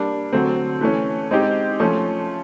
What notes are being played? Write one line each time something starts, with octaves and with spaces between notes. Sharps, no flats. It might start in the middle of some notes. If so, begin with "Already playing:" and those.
Already playing: G3 A#3 D4
D3 F#3 A3 C4
E3 A3 C#4
G#3 C4 D#4 G4
F3 A3 C#4